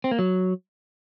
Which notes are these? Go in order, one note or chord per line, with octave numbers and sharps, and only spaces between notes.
C4
A#3
F#3